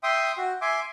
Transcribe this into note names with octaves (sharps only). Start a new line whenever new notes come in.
E5 G5 C6 D#6
F#4
E5 G#5 C6 D6